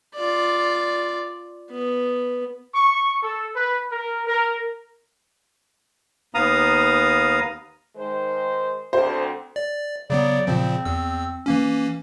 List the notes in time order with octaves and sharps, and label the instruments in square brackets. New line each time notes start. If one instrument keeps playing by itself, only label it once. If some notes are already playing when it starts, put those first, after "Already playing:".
[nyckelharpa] F4 D5
B3
[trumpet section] C#6
A4
B4
A#4
A#4
[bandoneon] D#2 B3 F5 A#5 D#6
[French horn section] D#3 G#3 C5
[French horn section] D2 C4 A4 [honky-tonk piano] C5
[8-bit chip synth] D5
[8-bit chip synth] C#3 F#3 B3 [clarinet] D5
[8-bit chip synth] A#2 C#3 F3 [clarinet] C4
[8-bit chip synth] E2 E6
E3 A#3 C#4